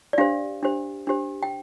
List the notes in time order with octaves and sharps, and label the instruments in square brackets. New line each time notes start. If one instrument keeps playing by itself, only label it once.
[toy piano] D5
D4 G4 C5 F5
D4 G4 C5
D4 G4 C5
G5